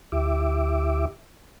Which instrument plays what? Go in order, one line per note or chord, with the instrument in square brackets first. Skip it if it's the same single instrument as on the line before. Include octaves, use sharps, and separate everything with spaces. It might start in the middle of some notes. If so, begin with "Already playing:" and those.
[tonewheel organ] D2 E4 G4 E5 D6